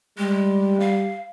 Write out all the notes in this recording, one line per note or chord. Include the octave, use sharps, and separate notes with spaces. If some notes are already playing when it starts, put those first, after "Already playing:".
G3 G#3
F5